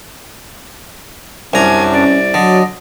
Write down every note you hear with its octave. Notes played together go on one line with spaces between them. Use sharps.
C2 F#2 D4 G#5 A#5
C#4 D5
D3 F#3 D#5